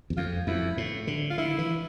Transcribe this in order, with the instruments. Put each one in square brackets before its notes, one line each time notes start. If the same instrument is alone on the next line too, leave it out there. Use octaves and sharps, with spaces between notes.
[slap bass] E2
[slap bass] F2 [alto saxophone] F4
[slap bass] F2 [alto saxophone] E4
[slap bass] A2
D3
[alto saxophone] F4
[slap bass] D3 [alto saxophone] E4
[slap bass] E3